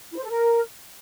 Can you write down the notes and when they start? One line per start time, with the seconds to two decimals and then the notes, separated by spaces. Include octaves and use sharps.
0.11 E4
0.17 C5
0.23 A4
0.29 A#4